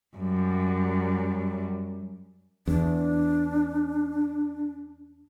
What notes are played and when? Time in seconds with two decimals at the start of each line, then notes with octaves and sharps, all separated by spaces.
0.17 F#2 G3
2.67 E2 D4